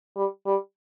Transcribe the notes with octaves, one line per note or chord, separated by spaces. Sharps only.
G3
G3